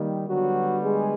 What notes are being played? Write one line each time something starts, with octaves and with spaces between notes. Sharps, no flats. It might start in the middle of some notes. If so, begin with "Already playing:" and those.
Already playing: D#3 G3 A#3
D3 F#3 G3 B3 F#4
G#3 G#4